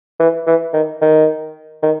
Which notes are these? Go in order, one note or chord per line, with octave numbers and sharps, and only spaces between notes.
E3
E3
D#3
D#3
D#3